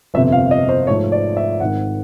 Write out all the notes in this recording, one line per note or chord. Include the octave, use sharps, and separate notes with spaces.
G1 F2 C3 E5
F5
D#5
C5
G#2 F3 A3 C#5
D5
E5
G#1 G#2 D#3 F#5